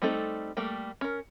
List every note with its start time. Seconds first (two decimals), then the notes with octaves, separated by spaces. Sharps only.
0.02 G3 A3 C4 D#4 A4
0.57 G3 A3 A#3 G5
1.01 C#4 A#4